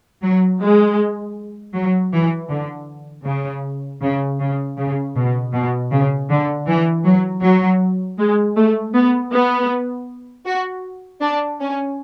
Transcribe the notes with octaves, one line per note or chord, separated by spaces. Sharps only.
F#3
G#3
F#3
E3
D3
C#3
C#3
C#3
C#3
B2
B2
C#3
D3
E3
F#3
F#3
G#3
A3
B3
B3
F#4
D4
C#4